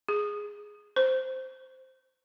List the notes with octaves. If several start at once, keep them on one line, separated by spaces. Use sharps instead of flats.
G#4
C5